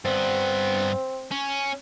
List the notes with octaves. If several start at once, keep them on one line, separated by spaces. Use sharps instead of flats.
G2 B3 C4
C#4